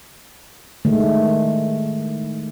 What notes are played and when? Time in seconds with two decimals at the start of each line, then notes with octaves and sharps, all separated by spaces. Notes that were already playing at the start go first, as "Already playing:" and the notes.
0.85 D#3 G#3 A3